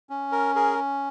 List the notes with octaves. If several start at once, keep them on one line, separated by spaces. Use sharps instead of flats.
C#4
A#4
G#4 A#4